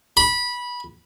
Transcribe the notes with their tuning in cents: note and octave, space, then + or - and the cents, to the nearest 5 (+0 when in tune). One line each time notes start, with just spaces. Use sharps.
B5 -15